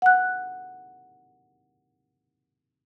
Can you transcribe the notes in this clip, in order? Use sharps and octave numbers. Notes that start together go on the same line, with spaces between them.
F#5 F#6